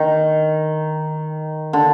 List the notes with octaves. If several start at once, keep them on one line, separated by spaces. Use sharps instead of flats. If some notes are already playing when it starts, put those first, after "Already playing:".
Already playing: D#3
D3